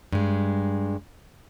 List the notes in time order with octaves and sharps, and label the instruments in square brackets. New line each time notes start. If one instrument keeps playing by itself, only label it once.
[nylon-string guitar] G2 G#3